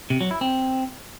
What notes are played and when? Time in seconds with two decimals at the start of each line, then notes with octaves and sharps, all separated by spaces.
0.10 C3
0.21 F#3
0.31 E4
0.41 C4